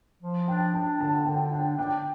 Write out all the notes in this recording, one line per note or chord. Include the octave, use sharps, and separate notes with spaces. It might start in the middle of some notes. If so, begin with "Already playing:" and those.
F3
D4 G5
D4 A5
D3 A5
D3 G5
D4 G5
D4 G5